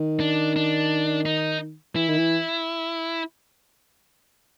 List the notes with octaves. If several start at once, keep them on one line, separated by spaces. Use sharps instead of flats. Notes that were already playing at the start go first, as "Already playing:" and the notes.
Already playing: D#3
D4
D4
D#4
E3 E4
D#3
E3